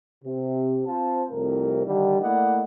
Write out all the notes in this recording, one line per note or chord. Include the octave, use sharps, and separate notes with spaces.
C3
C4 F4 C5 F5 A5
C2 F2 A2 C3 A#4
D3 D#3 G3
A3 A#3 E4 D5 D#5 F#5